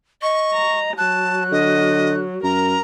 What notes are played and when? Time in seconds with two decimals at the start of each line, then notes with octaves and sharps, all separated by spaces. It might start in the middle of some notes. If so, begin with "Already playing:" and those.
0.22 D#5 C#6
0.54 A#5
0.98 F#3 A5 F#6
1.52 D3 D#5
2.44 F#2 A#4 A#5